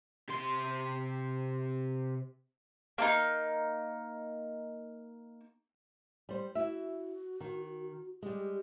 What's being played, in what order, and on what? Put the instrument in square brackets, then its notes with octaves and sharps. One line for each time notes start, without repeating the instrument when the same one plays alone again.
[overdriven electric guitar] C3 C6
[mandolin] A#3 D4 D#4
[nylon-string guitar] G3 C5
[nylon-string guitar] E4 E5 [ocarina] F#4
[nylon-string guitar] D#3
[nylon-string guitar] G3 G#3 [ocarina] G4